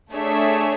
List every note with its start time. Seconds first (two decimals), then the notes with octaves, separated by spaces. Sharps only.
0.12 A3 D4 G#4 C#5 E5